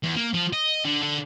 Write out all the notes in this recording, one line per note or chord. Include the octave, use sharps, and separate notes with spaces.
E2
A#3
F3
D#5
D3
D3